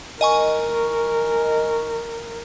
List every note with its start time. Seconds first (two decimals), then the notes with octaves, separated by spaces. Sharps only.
0.21 A#4 D#5 G#5 C#6